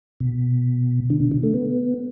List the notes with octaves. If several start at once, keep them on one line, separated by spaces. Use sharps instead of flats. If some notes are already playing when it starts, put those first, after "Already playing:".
B2
D3
B2
D3
A3
B3